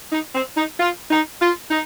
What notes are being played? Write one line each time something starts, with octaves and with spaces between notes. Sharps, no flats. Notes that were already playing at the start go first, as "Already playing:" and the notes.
D#4
C4
D#4
F4
D#4
F4
D#4